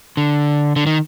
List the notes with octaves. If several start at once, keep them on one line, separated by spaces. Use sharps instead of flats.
D3
D3
D#3